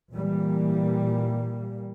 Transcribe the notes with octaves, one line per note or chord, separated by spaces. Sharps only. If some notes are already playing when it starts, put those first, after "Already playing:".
A#2 E3 G3 A#3